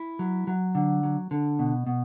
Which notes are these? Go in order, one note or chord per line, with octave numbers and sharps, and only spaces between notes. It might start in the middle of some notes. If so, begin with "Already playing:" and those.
Already playing: E4
F#3
F#3
D3
F#3
D3
B2
B2